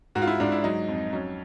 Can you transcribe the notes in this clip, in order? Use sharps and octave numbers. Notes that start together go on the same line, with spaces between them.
G#2 F#4
F4
E4
G#2 D4
E4
F#3 D#4
F2
F#3 C#4